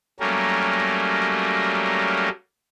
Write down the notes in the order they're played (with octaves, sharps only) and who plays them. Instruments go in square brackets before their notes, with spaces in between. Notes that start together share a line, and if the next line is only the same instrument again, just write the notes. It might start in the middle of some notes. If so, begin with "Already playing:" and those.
[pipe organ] F#3 G3 A3 A#3 C#4 A#4